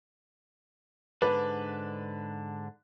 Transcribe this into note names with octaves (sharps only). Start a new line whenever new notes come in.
G#2 D3 D4 B4